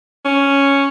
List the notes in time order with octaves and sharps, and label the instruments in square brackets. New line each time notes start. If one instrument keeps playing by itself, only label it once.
[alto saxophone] C#4